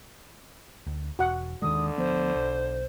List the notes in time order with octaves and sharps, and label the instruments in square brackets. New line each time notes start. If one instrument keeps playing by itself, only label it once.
[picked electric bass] D2
[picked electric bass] E1 [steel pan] F#4 F#5
[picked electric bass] D#2 D#3 G#3 [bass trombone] D3 [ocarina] D#6
[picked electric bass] D2 F3 B3 [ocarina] C5
[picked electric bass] B1